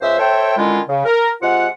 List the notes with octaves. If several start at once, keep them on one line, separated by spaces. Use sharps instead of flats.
C#2 C5 E5
A4 C5 C#5 E5 G5
D3 D#3 G#3 C#4 E4 F4
C#3
A#4
C3 G#3 F4 F#5